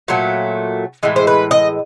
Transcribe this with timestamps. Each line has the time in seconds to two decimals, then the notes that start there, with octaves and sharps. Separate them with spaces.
0.08 A#2 F#3 A3
1.03 A2 E3 G#3
1.16 C5
1.27 B4
1.51 D#5